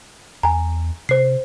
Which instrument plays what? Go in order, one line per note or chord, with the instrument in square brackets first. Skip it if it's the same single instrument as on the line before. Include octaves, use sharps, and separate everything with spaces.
[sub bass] E2 [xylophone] G#5 A#5
[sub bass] C3 [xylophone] C5 C7